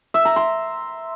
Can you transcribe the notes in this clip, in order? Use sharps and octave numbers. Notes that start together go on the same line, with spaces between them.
E5
A#5
C6